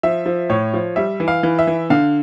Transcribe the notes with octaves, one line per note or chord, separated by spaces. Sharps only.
F3 E5
F3
A2 C#5
F3
G3 E5
E3
F5
E3
E5
E3
D3 F5